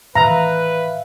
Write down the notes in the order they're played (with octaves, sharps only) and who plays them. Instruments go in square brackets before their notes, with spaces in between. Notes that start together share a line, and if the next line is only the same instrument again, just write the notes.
[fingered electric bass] A2 D#3 E3 [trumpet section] B4 [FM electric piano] E5 F5 [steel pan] A#5